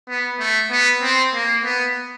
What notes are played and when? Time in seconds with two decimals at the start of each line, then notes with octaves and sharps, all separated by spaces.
0.08 B3
0.39 A3
0.70 B3
1.02 C4
1.33 A#3
1.64 B3